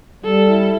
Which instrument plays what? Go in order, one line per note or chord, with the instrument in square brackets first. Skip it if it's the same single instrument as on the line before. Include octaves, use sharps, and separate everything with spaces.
[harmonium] G3 [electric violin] A4
[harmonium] E4